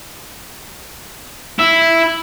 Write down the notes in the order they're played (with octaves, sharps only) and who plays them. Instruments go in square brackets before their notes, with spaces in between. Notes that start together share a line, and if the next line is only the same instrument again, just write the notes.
[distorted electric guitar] E4